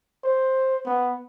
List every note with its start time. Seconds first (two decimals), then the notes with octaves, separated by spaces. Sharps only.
0.24 C5
0.86 B3